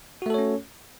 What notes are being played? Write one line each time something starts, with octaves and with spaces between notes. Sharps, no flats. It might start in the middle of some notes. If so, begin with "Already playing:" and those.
A3 C#4 F#4 A4 C#5